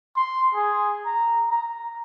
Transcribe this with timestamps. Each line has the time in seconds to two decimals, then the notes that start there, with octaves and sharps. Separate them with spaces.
0.17 C6
0.55 G#4
1.06 A#5
1.51 A#5